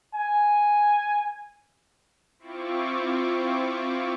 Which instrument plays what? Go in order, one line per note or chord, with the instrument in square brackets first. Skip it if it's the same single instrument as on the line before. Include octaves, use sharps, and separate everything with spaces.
[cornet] G#5
[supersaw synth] C4 E4 F4 C#6 D6